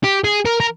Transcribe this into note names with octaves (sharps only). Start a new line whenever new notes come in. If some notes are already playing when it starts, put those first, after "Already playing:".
G4
G#4
A#4
A#4